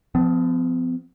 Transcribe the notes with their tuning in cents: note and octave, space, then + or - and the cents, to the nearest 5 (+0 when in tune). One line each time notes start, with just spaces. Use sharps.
F3 +0 B3 +45